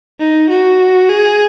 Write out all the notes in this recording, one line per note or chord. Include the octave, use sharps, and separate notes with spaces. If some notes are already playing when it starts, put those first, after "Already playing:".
D#4
F#4
G#4